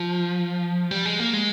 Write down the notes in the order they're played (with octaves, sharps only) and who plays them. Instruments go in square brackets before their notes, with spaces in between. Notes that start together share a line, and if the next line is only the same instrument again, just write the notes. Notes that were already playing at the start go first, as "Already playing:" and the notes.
Already playing: [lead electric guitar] F3
G3
G#3
A#3
G#3